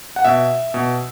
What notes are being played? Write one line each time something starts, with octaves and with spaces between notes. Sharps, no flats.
F#5
B2 E5
B2